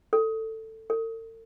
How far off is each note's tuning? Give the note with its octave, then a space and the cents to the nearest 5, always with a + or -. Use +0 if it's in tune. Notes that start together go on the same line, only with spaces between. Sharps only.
A4 +15
A4 +45